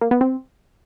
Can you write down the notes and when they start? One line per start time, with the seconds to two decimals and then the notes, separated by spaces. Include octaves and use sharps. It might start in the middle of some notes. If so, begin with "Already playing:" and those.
0.01 A#3
0.11 B3
0.21 C4